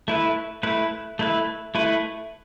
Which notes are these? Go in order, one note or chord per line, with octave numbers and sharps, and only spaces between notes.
A3 E4 B4
A3 E4 B4
A3 E4 B4
A3 E4 B4